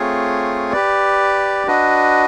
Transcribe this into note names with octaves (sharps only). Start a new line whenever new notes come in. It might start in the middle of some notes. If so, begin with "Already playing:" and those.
Already playing: A3 C4 F4 G#4 C#5
G4 B4 D5
D4 F#4 B4 D#5